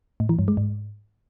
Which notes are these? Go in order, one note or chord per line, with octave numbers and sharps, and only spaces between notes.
A2
E3
G2
G#3
G#2